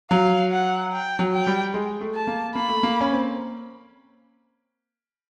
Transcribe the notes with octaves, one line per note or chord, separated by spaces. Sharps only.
F#3 F5
F#5
G5
F#3
G5
G3
G#3
A3
A5
A#3
A#3 B5
A3
A#3
C#4
C4